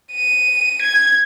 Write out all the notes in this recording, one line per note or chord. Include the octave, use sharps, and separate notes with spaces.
D#7
G#6